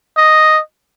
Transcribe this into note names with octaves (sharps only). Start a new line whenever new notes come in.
D#5